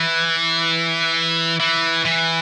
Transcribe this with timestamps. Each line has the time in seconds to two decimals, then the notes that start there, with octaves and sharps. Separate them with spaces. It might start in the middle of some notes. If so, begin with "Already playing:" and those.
Already playing: E3
1.60 E3
2.05 E3